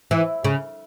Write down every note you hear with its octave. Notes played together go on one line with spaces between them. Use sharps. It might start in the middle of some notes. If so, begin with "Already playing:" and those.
E3
C#3